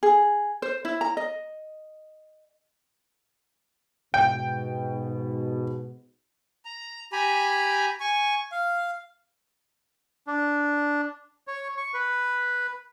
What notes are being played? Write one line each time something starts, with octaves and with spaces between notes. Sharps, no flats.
G#4
C5
E4
A#5
D#5
G#2 B2 G5
A#5
G4 G#5 A#5 B5
G#5 C#6
F5
D4
C#5
C#6
B4